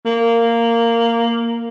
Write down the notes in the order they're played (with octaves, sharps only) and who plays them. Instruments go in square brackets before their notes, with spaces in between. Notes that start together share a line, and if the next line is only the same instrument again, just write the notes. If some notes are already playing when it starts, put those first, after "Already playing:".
[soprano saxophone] A#3